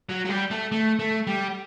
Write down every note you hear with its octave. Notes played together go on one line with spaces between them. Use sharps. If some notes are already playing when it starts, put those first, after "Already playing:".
F#3
F#3
G3
A3
A3
A3
G3